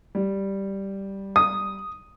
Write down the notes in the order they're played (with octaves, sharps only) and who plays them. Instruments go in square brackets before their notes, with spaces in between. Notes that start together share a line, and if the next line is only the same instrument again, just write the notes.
[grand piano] G3
[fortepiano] D#6